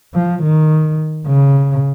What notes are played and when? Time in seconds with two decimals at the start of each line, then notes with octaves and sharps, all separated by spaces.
0.14 F3
0.43 D#3
1.27 C#3